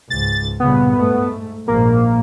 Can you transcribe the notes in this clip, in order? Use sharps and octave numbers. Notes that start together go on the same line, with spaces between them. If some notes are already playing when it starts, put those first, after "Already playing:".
C#2 G#2 A6
G2 A#2 C#3 B3
G#2 A3
A#1 G#2 A#3